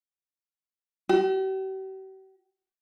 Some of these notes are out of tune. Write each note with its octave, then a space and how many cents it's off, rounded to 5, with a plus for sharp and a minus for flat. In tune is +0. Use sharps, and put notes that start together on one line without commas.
G4 -45